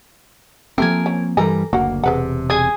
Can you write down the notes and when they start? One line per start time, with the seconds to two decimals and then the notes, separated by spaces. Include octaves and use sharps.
0.78 F3 A3 A#3 C4 G4 A#4 G#5
1.06 C#4
1.37 G2 E3 G3 A4 A#4 G#5 A#5
1.73 F#1 D2 A#3 F#4 F#5
2.04 E1 C3 G#4 B4 F#5
2.50 G#4 D5 G#5 D#6